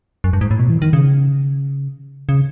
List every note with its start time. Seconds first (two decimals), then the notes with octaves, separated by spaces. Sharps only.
0.24 F#2
0.33 G2
0.41 G#2
0.51 A2
0.59 B2
0.69 E3
0.82 D#3
0.93 C#3
2.29 C#3